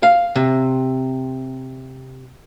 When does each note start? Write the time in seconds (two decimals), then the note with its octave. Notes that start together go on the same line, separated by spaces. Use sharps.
0.03 F5
0.36 C3